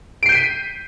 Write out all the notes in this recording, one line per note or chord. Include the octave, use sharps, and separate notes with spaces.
G6 B6 C7 D7 D#7